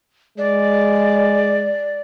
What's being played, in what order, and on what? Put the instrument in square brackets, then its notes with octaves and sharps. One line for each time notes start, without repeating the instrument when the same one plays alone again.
[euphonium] G#3 [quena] D5